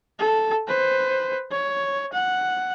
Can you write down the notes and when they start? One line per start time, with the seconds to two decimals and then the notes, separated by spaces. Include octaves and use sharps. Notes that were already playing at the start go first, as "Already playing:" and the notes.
0.19 A4
0.68 B4 C5
1.51 C#5
2.13 F#5